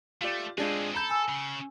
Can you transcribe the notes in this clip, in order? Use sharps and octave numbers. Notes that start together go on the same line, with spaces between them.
A3 F4 G4 D5
G#3 C4 D4 F4 G#4
A4 A#5 B5 G6
G#5 E6
C#3